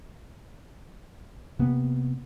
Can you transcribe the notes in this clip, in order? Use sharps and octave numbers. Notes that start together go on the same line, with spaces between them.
C3 A#3 B3